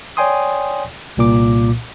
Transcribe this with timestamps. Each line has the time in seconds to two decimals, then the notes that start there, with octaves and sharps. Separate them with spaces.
0.17 C#5 D5 G5 G#5 C6 D#6
1.17 C2 A#2 D6